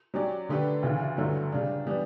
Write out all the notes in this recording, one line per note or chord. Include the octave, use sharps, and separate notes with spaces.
F#3 C#4 G4 D5
D3 A3 D4 G4 B4
D2 C#3 E3
G2 D3 F#3 A3 E4
C#3 G3 D4
E3 G3 B3 D4